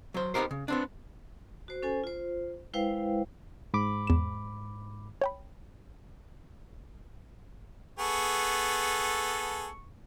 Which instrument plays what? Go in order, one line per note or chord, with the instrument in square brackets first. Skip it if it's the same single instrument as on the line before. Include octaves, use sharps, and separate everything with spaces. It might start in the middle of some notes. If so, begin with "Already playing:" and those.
[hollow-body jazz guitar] F#3 C5
B3 D#4 F4 G4 A#4 C5
C#3
B3 C4 D4
[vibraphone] F#4 C5
C#4 A4 C5 G#5
F4 C5
G#3 E4 B4 C5 F5 G5
[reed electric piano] G#2 B5 D6
[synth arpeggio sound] E2 E7
C#5 G5 B5
[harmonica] B3 G#4 A4 [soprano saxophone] C#6